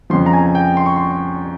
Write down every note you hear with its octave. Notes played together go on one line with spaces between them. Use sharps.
F2 C#3 F3 C6
A#5
G#5
G5
C6
C#6
C6
C#6